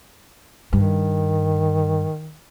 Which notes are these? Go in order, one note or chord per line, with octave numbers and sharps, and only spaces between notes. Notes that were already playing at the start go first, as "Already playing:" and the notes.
G2 D#3